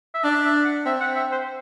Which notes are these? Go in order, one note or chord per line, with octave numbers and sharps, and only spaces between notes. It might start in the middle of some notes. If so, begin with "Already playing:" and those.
E5
D4 D5
E5
F#5
C4 E5
F#5
E5
C5